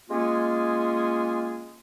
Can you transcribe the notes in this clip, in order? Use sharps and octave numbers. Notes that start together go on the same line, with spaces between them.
G#3 A#3 C#4 F4 G#4